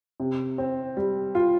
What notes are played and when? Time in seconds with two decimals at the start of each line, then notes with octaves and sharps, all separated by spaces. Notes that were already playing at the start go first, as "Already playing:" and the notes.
0.20 C3
0.58 C4
0.97 G3
1.35 F4